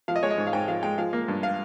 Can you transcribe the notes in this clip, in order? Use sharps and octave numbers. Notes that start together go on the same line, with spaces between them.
F3 F5
D#5
G#3 C#5
D#5
G#2
F5
G#2 G5
F3 F5
G#3 G5
F3 F5
A#3
G2
F5